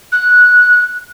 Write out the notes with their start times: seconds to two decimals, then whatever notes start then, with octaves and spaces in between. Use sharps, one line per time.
0.12 F#6